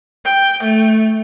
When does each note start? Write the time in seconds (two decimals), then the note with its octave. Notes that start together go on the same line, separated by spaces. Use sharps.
0.26 G5
0.63 A3